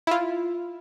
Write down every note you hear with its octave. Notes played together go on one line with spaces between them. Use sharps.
E4 F4